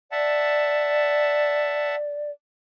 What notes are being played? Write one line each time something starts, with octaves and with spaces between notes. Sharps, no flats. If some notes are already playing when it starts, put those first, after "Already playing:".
D5 E5 F#5 A5